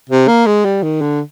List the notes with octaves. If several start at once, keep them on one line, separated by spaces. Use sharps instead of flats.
C3
A#3
G#3
G3
D#3
D3